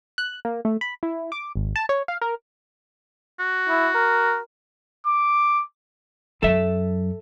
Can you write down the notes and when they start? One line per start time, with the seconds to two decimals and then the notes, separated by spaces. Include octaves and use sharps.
0.18 F#6
0.45 A#3
0.65 A3
0.81 B5
1.03 E4
1.32 D6
1.55 G#1
1.76 A5
1.89 C#5
2.08 F5
2.21 A#4
3.39 F#4
3.69 E4
3.95 A#4
5.06 D6
6.43 F#2 F#3 A4 E5